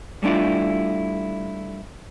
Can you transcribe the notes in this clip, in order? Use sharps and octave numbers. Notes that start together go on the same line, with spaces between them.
G3 A3 D4 E4 F4